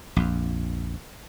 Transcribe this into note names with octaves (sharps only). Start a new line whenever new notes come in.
A#1 F2